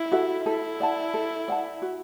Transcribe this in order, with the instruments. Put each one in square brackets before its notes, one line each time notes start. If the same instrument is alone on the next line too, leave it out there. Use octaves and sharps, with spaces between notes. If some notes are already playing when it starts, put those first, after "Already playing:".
Already playing: [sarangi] E4
[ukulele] F#4 A4 E5
[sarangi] E4 [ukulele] A4
[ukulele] D5 F#5 A5
A4
D5 F#5 A5
F#4